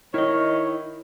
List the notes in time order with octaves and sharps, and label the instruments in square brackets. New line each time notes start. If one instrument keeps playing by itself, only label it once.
[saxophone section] D#3 C#5 [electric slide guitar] E4 D#5